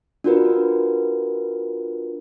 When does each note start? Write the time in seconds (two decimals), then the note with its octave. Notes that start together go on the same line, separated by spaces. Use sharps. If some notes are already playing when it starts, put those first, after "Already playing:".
0.24 D4 F4 F#4 A#4 B4